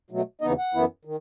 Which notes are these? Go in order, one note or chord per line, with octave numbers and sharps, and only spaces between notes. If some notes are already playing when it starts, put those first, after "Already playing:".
B2 F#3 A3
D#2 C#3 E3 B3 D#4 D#5
F#5
F#2 E3 B3 E4
D#3